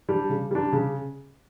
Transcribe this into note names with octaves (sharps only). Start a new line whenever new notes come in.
G3 D4
C#3
G3 D4
C#3